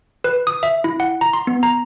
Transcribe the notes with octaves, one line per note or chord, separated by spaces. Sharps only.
B4
D#6
E5
E4
F#5
A#5
C6
B3
A#5